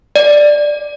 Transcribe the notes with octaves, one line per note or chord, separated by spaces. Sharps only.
D5